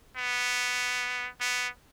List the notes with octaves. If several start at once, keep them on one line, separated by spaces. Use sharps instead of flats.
B3
B3